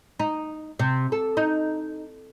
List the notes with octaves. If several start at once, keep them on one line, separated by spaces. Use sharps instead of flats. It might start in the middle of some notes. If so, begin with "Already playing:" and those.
D#4
C3
A4
D#4